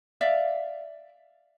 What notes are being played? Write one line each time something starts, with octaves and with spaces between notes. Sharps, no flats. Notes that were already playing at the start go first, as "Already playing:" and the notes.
D5 E5 F5